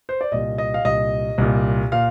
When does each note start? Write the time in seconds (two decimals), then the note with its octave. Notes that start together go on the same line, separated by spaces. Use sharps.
0.09 C5
0.21 D5
0.32 C2 A#2 D#5
0.58 D#5
0.74 F5
0.85 C2 A#2 D#5
1.38 C2 A#2
1.92 A#2 F5